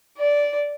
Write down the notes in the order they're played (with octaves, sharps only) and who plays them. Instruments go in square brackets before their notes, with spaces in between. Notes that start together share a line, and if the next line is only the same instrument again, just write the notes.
[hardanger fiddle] D5